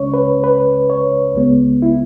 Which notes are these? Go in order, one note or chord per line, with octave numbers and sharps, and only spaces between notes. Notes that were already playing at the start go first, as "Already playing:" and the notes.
Already playing: C#2 C#3 G#3 C#4 C#5
B4
B4
C#5
C#2 C#3 G#3 B3
E4